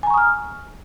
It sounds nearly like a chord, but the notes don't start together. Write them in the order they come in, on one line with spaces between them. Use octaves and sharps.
G#5 A#5 C#6 D#6 F6